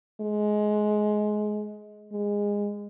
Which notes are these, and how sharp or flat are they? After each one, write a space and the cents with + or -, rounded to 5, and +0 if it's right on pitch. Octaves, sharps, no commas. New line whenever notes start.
G#3 +20
G#3 -20